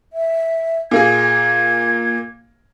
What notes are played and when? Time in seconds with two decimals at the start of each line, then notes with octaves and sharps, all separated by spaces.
0.13 E5
0.91 A#2 A#3 G#4 G#6